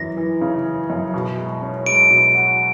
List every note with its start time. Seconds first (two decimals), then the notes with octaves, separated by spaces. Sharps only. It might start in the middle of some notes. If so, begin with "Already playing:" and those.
Already playing: F#2 E3 A#6
0.17 E3
0.41 C#3
0.66 E3
0.90 F#2
1.14 B2
1.38 G#3
1.62 C#4
1.86 G#3 D7
2.10 B2
2.35 F#4